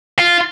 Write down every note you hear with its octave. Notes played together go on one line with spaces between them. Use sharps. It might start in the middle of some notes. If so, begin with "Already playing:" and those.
F4